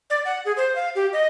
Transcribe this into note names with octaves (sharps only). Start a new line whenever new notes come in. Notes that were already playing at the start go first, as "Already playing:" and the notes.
D5
F#5
G#4
C5
F5
G4
D#5